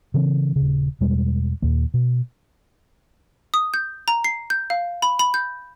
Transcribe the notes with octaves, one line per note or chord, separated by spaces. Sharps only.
C#3 E3 C4
D#1 C#3
E2 B2 G3 G#3
D#2 A#2 A#3
B2
D#6
G6
A#5
C7
G6
F5
B5
B5
G6